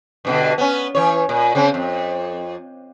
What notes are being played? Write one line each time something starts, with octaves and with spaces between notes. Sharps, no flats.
G2 B2 D3
B3 C#4
E3 C#5
A#2
C#3 C4
F2